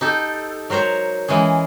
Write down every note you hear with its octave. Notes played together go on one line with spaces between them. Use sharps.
D#4 G4 A4
F#3 A#4 C5 C#5 A#5
E3 G#3 C#4 G#4